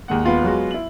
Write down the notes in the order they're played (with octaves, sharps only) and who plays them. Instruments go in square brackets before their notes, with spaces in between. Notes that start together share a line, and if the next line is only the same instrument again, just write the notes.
[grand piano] D#2 G#3 F#5
[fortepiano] B3 F4
[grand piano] F#3 G#3 F#4
E4 F#7